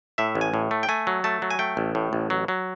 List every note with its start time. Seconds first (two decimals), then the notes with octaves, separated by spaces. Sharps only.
0.18 A2 E5
0.35 A1
0.41 G#5
0.54 A2
0.71 A3
0.83 G5
0.89 A3 G#5
1.07 F#3
1.24 A3 A5
1.42 F#3
1.50 G#5
1.59 A3 G5
1.77 A1
1.95 A2
2.13 A1
2.30 F#3
2.48 F#3